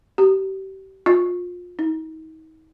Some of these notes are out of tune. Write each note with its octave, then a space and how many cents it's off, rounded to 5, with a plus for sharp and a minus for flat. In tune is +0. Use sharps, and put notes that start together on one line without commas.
G4 -35
F4 +25
D#4 +35